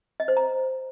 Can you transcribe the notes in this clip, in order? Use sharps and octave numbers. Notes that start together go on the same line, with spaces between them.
D#5
C5
A#5